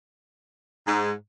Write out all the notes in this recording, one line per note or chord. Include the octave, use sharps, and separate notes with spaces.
G#2